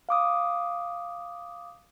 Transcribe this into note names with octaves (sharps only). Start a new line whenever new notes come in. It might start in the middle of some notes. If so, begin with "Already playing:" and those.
F5 D6 D#6